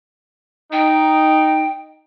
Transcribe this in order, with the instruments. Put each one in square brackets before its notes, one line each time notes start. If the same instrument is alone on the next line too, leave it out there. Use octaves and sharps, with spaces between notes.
[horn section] D#4 [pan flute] G5